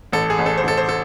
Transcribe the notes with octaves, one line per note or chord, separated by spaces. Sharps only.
A1 A4
G#4
A1
A4
C5
A1 A4
C5
A4